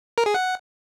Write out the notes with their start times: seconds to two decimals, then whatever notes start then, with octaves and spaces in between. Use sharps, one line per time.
0.18 A#4
0.26 G#4
0.34 F#5